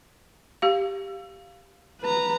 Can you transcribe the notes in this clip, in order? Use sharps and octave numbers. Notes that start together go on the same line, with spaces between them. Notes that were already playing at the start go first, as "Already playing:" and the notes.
G4 F5
B4 A#5